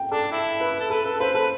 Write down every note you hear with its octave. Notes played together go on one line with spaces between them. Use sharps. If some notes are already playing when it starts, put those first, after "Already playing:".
Already playing: G5
D4 A4
E4
B4
A4
A4 B4
A4 B4
B4 C5
A4 B4